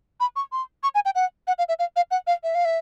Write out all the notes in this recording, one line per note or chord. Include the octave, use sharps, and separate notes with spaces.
B5
C#6
C6
C#6
G#5
G5
F#5
F#5
F5
E5
F5
F5
F#5
F5
E5
F5
E5